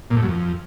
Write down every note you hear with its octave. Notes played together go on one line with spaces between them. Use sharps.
A#2
A2
F#2
F2